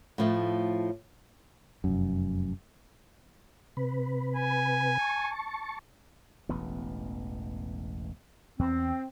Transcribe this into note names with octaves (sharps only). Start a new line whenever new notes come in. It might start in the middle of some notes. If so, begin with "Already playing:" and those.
A2 F3 A3
F1 F#2
C3 B4
G#5
A5 C#6
E1 A1 B3
E2 C4